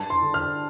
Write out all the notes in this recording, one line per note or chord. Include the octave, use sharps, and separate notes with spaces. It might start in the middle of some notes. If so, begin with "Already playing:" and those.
Already playing: G2 A5
C6
D3
F6